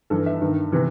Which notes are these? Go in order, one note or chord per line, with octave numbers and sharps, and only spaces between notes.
G2 E3 A4
E5
G2 D#3
C3 E3